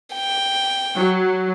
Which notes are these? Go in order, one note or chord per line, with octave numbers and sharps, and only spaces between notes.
G5
F#3 F#4